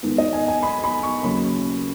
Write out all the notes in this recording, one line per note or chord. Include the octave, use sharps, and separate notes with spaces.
G#2 D#3 B3
D#5
G#5
G#5
B5
B5
C#6
D#2 C#3 F#3 C#4 B5